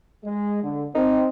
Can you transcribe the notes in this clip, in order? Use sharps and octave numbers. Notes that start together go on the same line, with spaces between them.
G#3
D3
C4 D#4